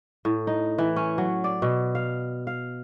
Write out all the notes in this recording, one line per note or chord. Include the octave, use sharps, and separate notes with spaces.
A2
D#4
E3
C#4
F#3
D5
B2
F5
F5